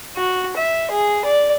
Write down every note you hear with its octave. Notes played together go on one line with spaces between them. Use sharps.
F#4
E5
G#4
D5